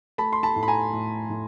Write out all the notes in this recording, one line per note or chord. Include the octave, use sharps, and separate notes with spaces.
A3 A5 B5
C6
A5 B5
A2
B5
G#5 A#5
A2
A2